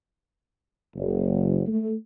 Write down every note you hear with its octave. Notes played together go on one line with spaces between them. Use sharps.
F#1
A3